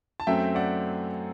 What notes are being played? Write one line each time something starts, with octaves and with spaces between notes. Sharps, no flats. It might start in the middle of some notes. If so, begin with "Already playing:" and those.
A5
F#2 F#3 A3 C4 E5 G5
D5 F#5